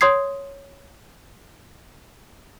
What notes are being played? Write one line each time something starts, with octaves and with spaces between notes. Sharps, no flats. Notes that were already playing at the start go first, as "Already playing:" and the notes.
C#5 C6 D#6 G#6 C7